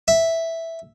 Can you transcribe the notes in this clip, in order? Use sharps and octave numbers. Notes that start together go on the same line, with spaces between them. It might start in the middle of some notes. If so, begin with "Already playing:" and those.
E5